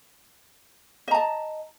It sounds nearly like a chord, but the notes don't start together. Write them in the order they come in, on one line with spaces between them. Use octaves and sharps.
D#5 A#5 A5